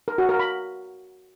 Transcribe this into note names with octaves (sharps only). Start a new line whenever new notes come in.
A#4
F#4
A#4
B5